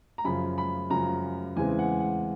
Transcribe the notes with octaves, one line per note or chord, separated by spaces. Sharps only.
A#5
F#2 C#3 F3 B5
B5
F#2 C#3 F3 A#5
E2 C#3 E3 G#3 C4 G#5
F#5
F#5